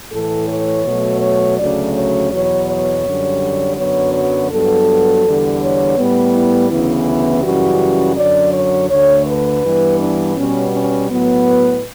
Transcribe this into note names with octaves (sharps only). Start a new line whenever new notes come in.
A2 E3 A3 A4
C#5
B2 F#3 A3
C#5
D2 C#3 F#3 A3 D5
C#5
E2 B2 F#3 B3 C#5
C#5
F#2 D3 G3
F#2 D3 F#3 B3 C#5
C#5
G2 F#3 B3 A4
E2 D3 G3
C#5
A2 G3 B3
E4
D2 C#3 E3 B3
E4
F#2 C#3 E3 G3 F#4
F#2 D3 F#3 D5
C#5
D2 D3 A3 C#5
B4
G2 E3 G3 B3
D4
B2 G3 B3 C#4
C#4
A2 F#3 B3
B4